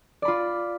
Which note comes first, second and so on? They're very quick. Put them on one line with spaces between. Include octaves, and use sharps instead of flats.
D5 B5 F4